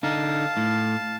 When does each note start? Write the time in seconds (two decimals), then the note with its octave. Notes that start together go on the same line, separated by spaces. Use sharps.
0.03 D3 D#4 F5 A5
0.57 A2